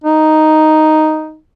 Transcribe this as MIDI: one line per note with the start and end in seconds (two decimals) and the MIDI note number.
0.04 1.38 63